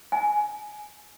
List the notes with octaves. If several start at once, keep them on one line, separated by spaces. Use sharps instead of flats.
G#5